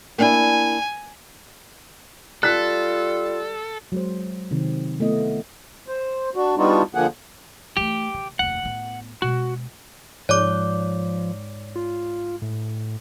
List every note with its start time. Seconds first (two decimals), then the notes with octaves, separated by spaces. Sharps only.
0.18 A#3 D4 E4 G#5
2.43 G3 F4 A4 F#6 B6
3.92 F#3 G#3 C5
4.51 C3 D#3 C4
5.00 A3 B3 E4 D#5
5.88 C5
6.35 D4 F#4
6.58 G3 B3 D4 D#4 F4 F#4
6.95 D3 F3 A#3 G#4 F#5
7.77 E3 A3 G4
8.14 C#3
8.39 F1 D#2 F#5
8.63 A2 B3
9.22 B2 G#3 F#4
10.29 G#2 F3 C#5 D5 D6
11.75 F4
12.42 A2